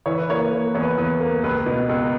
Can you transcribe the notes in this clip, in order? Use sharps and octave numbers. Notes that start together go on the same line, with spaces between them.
E3 C#5
B4
A#3 C#5
A#3
E2 C#5
B4
E2 B4
A#3
C#2 B4
B2
C#2